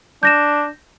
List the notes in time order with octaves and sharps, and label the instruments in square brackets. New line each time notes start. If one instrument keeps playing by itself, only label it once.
[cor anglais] D4 [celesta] G6 A#6 E7